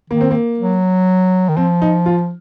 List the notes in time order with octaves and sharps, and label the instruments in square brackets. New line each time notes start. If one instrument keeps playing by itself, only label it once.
[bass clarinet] D#3 [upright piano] A#3
[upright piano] C4
A#3
[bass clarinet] F#3
D#3
[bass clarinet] F3 [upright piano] C4
[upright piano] D#4
F4